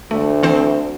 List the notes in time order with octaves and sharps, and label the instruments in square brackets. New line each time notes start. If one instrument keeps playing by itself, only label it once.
[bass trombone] D2 [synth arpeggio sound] A3
[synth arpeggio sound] E3 C4 C5